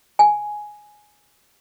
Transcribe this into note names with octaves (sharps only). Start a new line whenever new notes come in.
G#5